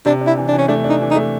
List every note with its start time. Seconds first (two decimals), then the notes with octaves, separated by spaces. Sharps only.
0.06 C3 D4
0.21 D4
0.27 E4
0.37 E3
0.48 D4
0.53 E3
0.58 C#4
0.68 A3 D4
0.84 D4
0.90 D#4
1.01 E3
1.11 D#4
1.16 A3